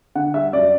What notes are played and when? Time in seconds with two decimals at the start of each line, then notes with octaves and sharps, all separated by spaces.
0.15 D3 F#5
0.34 G3 E5
0.53 F#2 D5